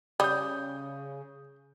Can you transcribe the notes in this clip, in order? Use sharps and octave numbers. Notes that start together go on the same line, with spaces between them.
C#3 G3 D#6 G6